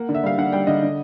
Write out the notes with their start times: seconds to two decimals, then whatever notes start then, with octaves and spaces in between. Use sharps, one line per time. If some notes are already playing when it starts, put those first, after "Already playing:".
Already playing: A#3 F#5
0.09 D3
0.15 E5
0.23 G3 F5
0.38 D3 F#5
0.52 G3 G5
0.67 D3 D#5
0.82 D3